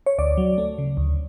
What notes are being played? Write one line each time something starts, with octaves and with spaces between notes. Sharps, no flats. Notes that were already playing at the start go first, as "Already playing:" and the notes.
C#5
D2 D5
F#3
A3
C#3
D2